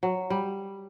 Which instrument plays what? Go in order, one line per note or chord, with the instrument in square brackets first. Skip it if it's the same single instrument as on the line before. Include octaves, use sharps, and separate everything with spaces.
[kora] F#3
G3